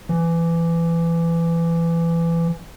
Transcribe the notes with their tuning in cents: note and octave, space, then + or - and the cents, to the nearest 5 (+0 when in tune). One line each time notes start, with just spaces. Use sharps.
E3 +25